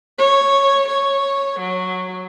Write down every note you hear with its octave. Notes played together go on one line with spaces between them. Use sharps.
C#5
C#5
F#3